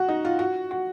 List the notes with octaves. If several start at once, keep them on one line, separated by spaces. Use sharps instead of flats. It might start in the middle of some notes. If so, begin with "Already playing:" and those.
Already playing: F#4
D#4
F4
F#4
F#4